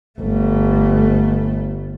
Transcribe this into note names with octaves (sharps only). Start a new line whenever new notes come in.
G1 A3